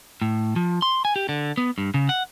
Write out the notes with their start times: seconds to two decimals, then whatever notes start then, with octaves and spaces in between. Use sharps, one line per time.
0.22 A2
0.56 F3
0.82 C6
1.05 G#5
1.16 G4
1.29 D3
1.58 B3
1.78 G2
1.94 C#3
2.09 F#5